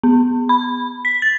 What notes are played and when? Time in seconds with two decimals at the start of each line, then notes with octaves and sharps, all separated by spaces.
0.03 B3
0.49 B5
1.05 B6
1.22 A6